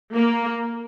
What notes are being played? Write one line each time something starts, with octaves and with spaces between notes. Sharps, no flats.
A#3